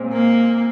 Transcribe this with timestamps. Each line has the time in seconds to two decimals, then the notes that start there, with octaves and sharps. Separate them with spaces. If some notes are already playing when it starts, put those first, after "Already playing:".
Already playing: A#2 G#3 C4
0.12 A#3